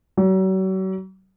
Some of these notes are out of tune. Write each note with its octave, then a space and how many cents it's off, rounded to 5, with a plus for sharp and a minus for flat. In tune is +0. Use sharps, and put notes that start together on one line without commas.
F#3 +40